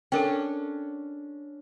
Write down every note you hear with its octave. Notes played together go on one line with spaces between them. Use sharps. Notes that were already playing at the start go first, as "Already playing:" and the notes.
C#4 D4 A4 A#4 G5